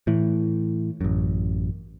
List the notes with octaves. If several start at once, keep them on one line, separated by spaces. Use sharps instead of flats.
A2 E3
A1 F#2